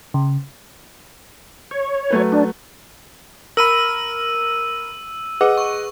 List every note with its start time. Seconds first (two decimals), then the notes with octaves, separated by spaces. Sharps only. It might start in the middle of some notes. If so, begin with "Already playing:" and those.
0.14 C#3
1.71 C#5
2.11 F#3 A3 B4
2.32 D4
3.57 A#4 B5 E6 D#7
5.41 G#4 B4 D#5 F#5
5.58 C#6